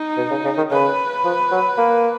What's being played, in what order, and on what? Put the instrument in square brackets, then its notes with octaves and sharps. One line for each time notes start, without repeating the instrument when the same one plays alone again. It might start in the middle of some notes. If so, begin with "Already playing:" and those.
Already playing: [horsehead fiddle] D#4
[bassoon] B2
C#3
C#3
D#3
[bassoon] C#3 [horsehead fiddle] B4
[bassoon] F3
F#3
A#3